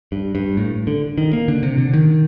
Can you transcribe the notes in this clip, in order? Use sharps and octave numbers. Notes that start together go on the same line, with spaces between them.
G2
G2
A2
D3
D#3
A#3
D3
C3
D3
D#3